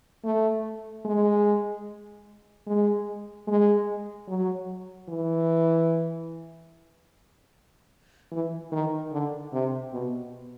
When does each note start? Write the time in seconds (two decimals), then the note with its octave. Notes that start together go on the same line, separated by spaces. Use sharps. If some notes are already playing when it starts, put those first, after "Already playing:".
0.24 A3
1.05 G#3
2.67 G#3
3.47 G#3
4.28 F#3
5.09 E3
8.32 E3
8.72 D#3
9.12 D3
9.53 C3
9.93 B2